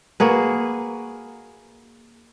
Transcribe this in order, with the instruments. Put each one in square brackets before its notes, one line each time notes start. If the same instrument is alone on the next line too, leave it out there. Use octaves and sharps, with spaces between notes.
[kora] A#3 F#4 G#4 B4